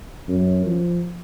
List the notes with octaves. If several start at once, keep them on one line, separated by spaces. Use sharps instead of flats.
F#2
F3